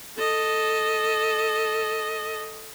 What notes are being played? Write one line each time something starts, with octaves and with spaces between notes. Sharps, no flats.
A4 D#5